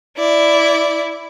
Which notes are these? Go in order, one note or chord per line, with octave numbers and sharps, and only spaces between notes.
E4 D5